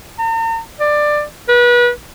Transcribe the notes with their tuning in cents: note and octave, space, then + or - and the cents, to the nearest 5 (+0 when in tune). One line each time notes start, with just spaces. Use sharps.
A#5 -45
D5 +15
B4 -30